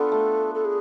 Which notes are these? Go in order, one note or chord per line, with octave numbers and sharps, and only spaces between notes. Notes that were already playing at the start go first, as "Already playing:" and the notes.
Already playing: B3 D4 F4 A4
A3
A4
G#4